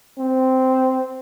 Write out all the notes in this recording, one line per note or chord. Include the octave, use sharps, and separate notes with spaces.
C4